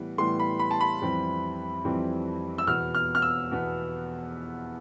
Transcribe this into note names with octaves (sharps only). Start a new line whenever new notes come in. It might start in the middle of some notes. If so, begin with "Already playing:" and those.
Already playing: A2 E3 G3 B3
A2 E3 G3 B3 C6
B5
B5
A5
B5
F2 E3 G3 C4
F2 E3 G3 C4
E6
E2 B2 B3 F6
F6
F6
E6
E2 B2 B3